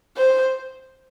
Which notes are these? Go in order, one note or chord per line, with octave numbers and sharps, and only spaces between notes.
C5